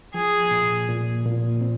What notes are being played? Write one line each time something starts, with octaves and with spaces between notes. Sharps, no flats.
F3 G#4
A#2
A#2
A#2
C4